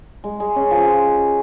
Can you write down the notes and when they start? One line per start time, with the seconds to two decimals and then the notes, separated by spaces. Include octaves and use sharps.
0.24 G#3
0.40 G#3
0.56 C#4
0.71 F3